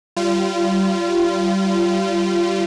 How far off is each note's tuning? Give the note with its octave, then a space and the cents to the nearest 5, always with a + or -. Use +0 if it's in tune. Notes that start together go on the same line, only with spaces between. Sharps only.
G3 -30 F4 -30